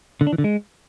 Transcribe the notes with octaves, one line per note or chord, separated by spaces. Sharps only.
D3
D4
E3
D3
G#3